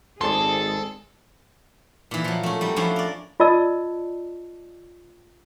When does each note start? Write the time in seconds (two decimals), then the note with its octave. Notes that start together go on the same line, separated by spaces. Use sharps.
0.21 G#1 G#3 C4 G#4 A4 D5 C6
2.11 A#2 E3
2.24 F3 F#3
2.43 A3 C#4
2.61 F#3 G3
2.76 F3 C#4 D4 E4
2.96 A#4 D5
3.40 F4 D5 D#5 A5 E6